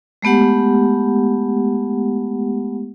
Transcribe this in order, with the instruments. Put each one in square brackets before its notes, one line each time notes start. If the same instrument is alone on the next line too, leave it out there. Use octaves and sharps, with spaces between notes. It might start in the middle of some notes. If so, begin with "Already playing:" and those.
[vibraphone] G#3 A3 B3 G4 F#5